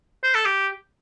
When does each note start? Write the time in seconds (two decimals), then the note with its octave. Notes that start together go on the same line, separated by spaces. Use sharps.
0.24 C5
0.35 A4
0.45 G4